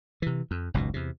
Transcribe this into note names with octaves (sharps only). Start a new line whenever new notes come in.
C3 E3
F2
F#1 C#2 G#2 B2
E2 C3